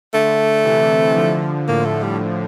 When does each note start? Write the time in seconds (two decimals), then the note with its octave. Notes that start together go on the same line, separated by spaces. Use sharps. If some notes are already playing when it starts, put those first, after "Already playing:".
0.14 D3 A3
0.65 C3 E3
1.16 D3 F3
1.68 A2 A#3
1.85 A3
2.03 G3